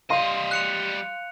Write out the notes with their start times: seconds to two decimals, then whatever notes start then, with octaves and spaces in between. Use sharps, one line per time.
0.10 G3 D#5 F5 C6
0.51 F#6 C#7 F7